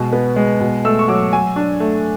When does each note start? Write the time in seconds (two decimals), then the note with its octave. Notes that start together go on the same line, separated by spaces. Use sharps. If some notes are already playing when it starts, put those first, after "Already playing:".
Already playing: B2 G#3
0.13 B3
0.36 G#3
0.61 B2
0.85 A3 E6
0.99 C#6
1.08 F#3 D6
1.32 F#3 G#5
1.56 D4
1.80 A3